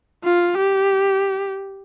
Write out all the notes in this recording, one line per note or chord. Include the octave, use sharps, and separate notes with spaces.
F4
G4